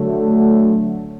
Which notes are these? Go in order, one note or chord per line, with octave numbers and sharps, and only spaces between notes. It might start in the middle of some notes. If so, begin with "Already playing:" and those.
Already playing: D3 F#3 A3